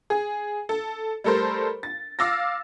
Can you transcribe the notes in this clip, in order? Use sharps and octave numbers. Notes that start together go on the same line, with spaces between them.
G#4
A4
G3 A3 A4 A#4 C5
A6
F5 D6 E6 A6 A#6